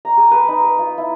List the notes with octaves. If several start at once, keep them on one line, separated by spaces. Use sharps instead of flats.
A#5
G#4
B4
D#4
B4
F4
E4